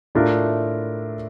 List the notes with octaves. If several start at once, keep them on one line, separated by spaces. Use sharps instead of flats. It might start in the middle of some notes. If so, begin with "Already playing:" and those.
A2 A3 D4 F4 A#4